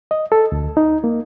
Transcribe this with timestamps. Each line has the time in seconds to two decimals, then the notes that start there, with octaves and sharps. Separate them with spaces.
0.11 D#5
0.32 A4
0.52 D2
0.77 D#4
1.04 A#3